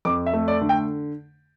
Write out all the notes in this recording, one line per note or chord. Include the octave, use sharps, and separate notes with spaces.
F2 D6
E5
A3
D5
D3
G5